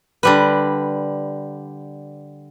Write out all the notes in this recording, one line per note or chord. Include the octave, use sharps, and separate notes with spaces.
D3 G3 B4